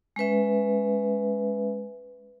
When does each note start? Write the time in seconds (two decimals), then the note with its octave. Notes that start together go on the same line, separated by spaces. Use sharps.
0.16 G#3 C#4 B4 E5